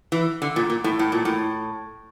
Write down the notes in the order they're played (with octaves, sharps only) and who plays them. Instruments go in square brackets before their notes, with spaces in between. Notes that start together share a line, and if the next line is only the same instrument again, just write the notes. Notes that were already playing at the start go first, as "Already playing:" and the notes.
[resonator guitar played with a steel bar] E3
D3
A#2
A#2
A2
A2
A#2
A2